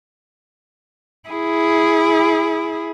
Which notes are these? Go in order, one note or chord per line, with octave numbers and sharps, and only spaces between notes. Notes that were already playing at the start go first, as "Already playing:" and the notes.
E4 G#4